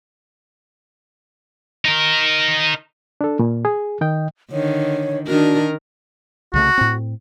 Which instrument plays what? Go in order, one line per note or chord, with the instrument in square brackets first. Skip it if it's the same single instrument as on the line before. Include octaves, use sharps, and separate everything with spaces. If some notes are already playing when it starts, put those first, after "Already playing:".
[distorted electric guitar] D#4 A#4
[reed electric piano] D4 A4
A#2
G#4
D#3 D#5 G5
[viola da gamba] D3 D#3 [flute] C#5
[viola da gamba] D#3 A#4 [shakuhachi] D4 [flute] F#4
[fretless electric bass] C2 C#3 A3 [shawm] F#4
[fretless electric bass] A2 C4